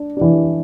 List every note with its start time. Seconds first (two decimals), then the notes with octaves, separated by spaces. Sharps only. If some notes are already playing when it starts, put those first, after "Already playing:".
Already playing: D4
0.17 E3 D4